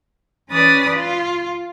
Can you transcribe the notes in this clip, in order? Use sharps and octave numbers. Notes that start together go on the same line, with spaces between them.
E3 C#4 B4 D5 D#6 A6
F4